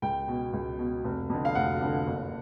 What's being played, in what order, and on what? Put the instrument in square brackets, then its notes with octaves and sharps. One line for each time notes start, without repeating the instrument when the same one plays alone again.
[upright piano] C#2 G5
B2
C#2
B2
F1
F2 D3
F5
F1 F#5
F2 D3
F#1